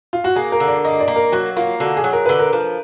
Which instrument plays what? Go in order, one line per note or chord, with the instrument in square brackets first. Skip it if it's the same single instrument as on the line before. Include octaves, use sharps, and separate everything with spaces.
[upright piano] F4
F#4
[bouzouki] A#3 [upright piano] G#4
[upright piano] A#4
[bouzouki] D3
[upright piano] D5
[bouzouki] A#3 [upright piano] D#5
[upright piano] D5
[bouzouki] A#3
[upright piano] A#4
[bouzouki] F#3 [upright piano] F#4
[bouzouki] A#3 [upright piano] F4
[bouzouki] D3 [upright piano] F#4
[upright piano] G#4
[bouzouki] F#3
[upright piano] A#4
[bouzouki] D3 [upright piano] B4
[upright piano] A#4
[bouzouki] F3